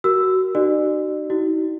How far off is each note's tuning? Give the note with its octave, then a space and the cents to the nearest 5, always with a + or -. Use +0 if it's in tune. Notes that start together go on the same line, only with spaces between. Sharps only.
F#4 +20 A#4 +0 E6 +0
D#4 -30 F#4 +35 D5 +40
D#4 +45 F#4 +35